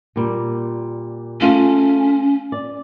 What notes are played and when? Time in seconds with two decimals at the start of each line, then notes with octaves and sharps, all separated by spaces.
0.16 A#2 G3
1.41 A3 C#4 F4 G#4
2.52 D5